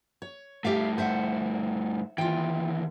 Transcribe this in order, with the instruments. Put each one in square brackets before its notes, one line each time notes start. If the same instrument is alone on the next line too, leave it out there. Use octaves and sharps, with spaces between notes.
[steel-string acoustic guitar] C#5
[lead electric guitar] G2 A3 [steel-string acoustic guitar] G4 E5 F5
[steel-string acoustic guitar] C5 E5 F#5
[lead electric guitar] D#2 E3 [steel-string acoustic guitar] F4 G5